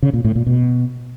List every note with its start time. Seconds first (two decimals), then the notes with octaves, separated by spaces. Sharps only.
0.02 C#3
0.13 A#2
0.24 A2
0.35 A#2
0.46 B2